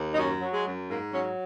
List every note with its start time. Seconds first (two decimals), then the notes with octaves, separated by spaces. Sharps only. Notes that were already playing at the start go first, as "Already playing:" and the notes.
Already playing: D#2
0.13 D#4
0.17 F#2 C#4
0.41 F#3
0.53 G#3
0.65 F#2
0.89 G#2 A#3
1.12 F#3 C#4